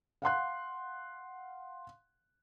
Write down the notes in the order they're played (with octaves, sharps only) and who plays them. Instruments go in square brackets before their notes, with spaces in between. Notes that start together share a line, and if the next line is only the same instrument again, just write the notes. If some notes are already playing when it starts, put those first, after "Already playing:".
[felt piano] F5 F#5 C6 F#6